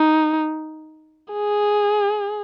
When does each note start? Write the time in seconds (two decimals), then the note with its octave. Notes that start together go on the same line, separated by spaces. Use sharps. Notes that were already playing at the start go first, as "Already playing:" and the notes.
Already playing: D#4
1.32 G#4